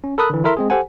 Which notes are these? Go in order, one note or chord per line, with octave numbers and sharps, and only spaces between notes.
C#4
A4 A#4 B5 D#6 F#6
D3 E3
E4 A4 A#4 E5 C6
G#3 C4 G#4
G4 A4 C5 F#5 G#5